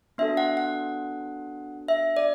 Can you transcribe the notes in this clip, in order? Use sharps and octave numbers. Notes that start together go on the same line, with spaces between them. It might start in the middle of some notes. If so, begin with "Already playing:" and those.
B3 D4 F#4 A4 E5
F#5
F#5
E5
D5